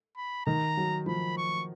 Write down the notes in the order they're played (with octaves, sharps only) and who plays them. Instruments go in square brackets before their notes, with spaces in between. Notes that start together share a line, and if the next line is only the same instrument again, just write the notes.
[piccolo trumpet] B5
[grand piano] D#3 [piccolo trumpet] A#5
[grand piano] F#3
[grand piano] F3 [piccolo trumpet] B5
[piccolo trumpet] C#6